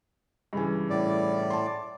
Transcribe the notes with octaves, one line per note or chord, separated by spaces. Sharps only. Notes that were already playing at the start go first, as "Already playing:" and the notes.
G2 C#3 E3
A2 D5
A5 C6